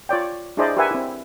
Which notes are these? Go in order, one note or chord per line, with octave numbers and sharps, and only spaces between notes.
F4 C#5 D5 G5
D4 E4 G#4 C5 D5 D#5
G4 A#4 B4 E5 F#5 G#5
C4 E4